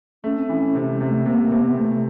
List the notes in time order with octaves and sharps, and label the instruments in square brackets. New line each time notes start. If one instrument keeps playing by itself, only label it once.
[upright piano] A3 [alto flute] C#4
[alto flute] C4
[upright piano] E3 [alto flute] C#4
[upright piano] C3
[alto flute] G#3
[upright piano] C3
[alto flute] A3
[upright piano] C3 [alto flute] A#3
[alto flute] A#3
[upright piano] C3
[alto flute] B3
[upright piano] C3 [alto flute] A3